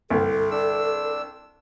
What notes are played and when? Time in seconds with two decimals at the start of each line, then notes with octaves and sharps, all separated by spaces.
0.10 C2 G2 D3 A4
0.51 D4 E6